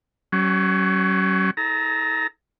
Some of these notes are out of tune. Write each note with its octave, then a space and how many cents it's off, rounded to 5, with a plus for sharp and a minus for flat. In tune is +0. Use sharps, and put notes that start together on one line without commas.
F#3 +40 C#4 +5
E4 -45 A4 -25 A#5 +0